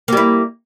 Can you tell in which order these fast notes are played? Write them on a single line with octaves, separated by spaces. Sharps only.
A#3 G3 E4